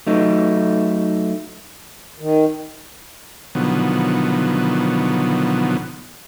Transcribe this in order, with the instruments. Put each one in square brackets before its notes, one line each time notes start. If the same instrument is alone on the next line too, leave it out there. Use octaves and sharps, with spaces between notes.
[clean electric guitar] F#3 A3 D#4
[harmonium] D#3
[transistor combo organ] B2 D3 D#3 F3 F#3 B3